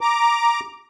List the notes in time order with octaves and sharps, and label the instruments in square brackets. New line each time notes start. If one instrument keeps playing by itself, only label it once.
[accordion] A#5 D6